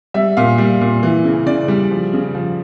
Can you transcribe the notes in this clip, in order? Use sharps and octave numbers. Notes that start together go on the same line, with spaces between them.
G3 E5
A#2 F5
G3
A#2
E3
C#3
C#3 D5
G3
F3
C#3
F3